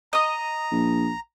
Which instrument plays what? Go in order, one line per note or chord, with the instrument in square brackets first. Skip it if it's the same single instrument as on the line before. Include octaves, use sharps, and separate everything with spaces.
[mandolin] D#5 D#6 [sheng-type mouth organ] A#5
[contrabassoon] A#1